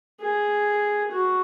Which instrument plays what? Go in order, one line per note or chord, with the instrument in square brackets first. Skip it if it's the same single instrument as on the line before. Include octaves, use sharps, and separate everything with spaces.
[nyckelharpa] G#4
F#4